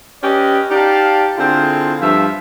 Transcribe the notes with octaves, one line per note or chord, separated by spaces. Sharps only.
C#4 G4 B4 D5 D#5
D#4 G4 D5 F5 A5
D3 C4 E4 F4 G#4
G2 F3 E5